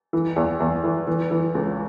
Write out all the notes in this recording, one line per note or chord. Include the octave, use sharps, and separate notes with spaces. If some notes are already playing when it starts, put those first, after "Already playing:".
E3
E2
E2
E3
E3
E3
C#2